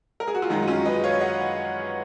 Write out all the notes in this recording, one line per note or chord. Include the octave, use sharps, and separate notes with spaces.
A#4
G#4
F#4
F4
F#2 D#3 G#3 D#4
D#4
C#4 F4
B4 D#5
C#5 F5
D#5 F#5